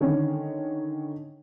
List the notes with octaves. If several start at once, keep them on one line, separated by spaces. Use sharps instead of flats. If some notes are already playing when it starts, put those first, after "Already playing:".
D3 D#3 C#4